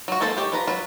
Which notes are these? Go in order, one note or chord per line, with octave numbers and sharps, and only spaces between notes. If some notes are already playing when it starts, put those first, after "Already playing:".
F#3 F#4
G#3 A#3 A4 C5
D#3 G4 C#5
F3 B4 A#5
F#3 F4 B4